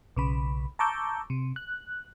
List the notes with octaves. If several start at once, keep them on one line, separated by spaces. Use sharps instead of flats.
B1 C#3 B5
A5 A#5 C#6 D6 E6 G6
C3
F#6